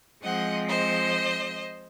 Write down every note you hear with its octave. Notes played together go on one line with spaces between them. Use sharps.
F3 G#3 C4 D#5 F#5
C5 D#5